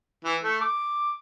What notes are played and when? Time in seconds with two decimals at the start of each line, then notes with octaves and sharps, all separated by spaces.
0.24 E3
0.43 A3
0.61 D6